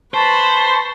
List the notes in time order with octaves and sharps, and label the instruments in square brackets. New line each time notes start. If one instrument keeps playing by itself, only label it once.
[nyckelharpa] B4 B5 [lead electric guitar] C5 [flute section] A5 C#6